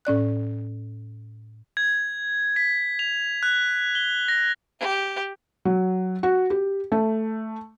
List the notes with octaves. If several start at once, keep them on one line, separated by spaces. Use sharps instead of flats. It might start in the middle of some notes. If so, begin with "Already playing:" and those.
A2 C#4 D5 F#6
G#6
B6
F7
F#6
G7
A#6
G4
F#3
F#4
G4
A3